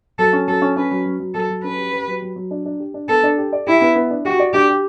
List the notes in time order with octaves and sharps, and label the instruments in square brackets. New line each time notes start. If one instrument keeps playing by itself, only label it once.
[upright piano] F#3 [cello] A4
[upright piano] C#4
[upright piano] F#3 [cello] A4
[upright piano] C#4
[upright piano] C#4 [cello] B4
[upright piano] F#3
F#3
F#3
[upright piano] F#3 [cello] A4
[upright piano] F#3
[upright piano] C#4 [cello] B4
[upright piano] G4
G4
F#3
F#3
F#3
D4
D4
G4
D4
[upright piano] B3 [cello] A4
[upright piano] D4
G4
D5
[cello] E4 [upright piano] G4
[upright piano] B3
B3
D4
[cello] F#4 [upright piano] G4
[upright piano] D5
[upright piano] D4 [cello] G4
[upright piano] G4